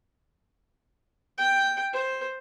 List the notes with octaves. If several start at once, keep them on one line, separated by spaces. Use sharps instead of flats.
G5
C5